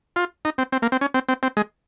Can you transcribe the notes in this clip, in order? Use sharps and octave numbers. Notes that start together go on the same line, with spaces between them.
F4
D#4
C4
C4
A#3
C4
C#4
C4
C4
C4
G#3